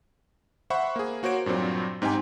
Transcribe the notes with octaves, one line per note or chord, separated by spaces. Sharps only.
C5 E5 F#5 B5 C#6
A#3 G#4
A#3 F#4 C5 C#5 D7
G2 A#2 F#3 C4
G#2 C4 D#4 G4 G5 G#5